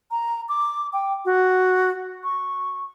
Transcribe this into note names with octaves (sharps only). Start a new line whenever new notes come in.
A#5
D6
G5
F#4
C#6